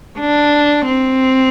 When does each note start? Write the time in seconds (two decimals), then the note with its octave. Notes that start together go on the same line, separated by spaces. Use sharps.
0.19 D4
0.86 C4